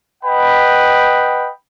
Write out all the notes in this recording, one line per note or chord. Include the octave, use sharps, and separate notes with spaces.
B4 D#5 F#5 G5 B5